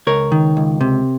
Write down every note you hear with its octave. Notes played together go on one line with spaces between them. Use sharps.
C#2 A#4 C#5
D#3
C#2
C3